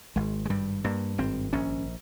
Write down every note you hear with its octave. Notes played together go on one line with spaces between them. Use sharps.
G#1 G#3
G#3
G2 G3
G2 A#3
G#1 C4
A#1 C#4